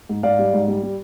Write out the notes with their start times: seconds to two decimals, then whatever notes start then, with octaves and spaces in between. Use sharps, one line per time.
0.09 G#2
0.23 G#2 D5 F5
0.39 G3
0.53 G#2
0.68 G3
0.83 G3